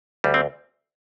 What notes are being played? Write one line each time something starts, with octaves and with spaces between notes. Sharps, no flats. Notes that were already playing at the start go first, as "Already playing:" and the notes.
D2 G3
C4